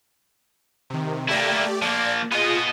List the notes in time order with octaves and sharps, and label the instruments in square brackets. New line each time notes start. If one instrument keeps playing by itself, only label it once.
[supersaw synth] C3 D#3
[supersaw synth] A3 G4 D5 [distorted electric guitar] A#3 E4
[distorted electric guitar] F3 A#3 [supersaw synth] D5
[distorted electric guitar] B3 D#5 [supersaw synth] F4 G#4